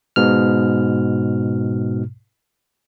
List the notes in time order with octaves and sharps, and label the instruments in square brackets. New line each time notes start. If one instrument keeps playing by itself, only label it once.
[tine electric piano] G#2 B2 F6